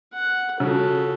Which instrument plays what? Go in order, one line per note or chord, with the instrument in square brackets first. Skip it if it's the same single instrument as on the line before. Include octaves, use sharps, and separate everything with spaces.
[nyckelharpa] F#5
[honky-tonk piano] C#3 F3 [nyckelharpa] F#4 A4